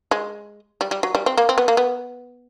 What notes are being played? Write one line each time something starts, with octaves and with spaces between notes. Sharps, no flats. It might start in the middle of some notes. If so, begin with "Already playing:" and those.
G#3
G3
G3
F#3
G3
C4
A#3
C4
B3
A#3
B3